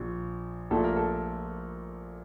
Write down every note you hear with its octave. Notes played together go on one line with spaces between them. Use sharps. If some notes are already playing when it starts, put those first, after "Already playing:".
Already playing: A#1 A#2
A#1 A#2 A3 A4
A#4
A4